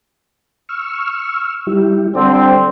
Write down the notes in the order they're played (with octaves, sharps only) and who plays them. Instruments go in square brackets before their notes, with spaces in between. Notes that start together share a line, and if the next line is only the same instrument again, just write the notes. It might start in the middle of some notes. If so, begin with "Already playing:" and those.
[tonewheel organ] C#6 E6 F6
G3 E4 G4
[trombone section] D3 C4 [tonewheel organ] G3 D5